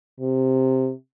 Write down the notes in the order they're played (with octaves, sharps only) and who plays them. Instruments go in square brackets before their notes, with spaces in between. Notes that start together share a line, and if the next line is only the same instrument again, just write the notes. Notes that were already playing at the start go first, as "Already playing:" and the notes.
[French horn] C3